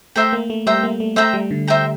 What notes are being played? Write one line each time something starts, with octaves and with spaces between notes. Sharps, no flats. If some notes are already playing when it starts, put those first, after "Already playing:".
A3 C5 E5 G5 A#5
A#3
A3
G3 C5 E5 G5 A#5
A#3
A3
A3 C5 E5 G5 A#5
G3
D3
C5 E5 G5 A#5